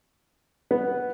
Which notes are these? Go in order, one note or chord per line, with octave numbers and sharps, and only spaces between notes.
B3